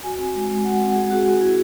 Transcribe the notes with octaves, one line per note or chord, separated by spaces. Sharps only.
F#4 G#5
C4
G#3
G#3
F#4 F#5
C4 F#5
G#3 G#4
G#3 F#4
C4 F#4
E4 G#4